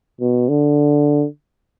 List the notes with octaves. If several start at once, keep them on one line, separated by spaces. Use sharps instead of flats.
B2
D3